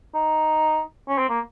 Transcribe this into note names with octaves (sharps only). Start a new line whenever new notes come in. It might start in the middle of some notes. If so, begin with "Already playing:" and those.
D#4
C#4
C4
A#3